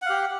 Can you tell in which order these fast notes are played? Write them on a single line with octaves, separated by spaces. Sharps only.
F#5 F5 G4